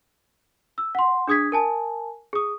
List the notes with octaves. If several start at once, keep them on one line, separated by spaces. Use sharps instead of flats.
E6
F#5 C6
D4 G#4 D#6 G#6 B6
A#4 G#5 A5
G#4 D#6